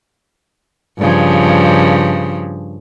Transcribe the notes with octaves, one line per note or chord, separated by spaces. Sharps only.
G2 C#3 F3